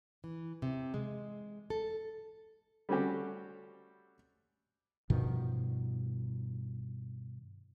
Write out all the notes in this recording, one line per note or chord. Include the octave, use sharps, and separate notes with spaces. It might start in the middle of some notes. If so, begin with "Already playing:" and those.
E3
C3
G#3
A4
G3 A3 C4 C#4 F#4 G4
G2 B2 D#3 F3